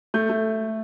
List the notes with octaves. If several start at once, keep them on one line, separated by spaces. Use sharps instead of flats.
A3 G6
A3